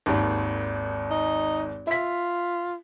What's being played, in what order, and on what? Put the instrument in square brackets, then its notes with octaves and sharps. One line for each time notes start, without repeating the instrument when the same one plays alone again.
[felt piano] G#1 D#2
[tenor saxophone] D#4
[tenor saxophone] F4 [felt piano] E5 B6